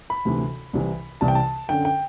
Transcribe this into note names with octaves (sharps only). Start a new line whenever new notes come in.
B5
D2 C3 E3
C2 C3 E3
C2 C3 E3 A5
G5
A5
F#2 D3 G5
G5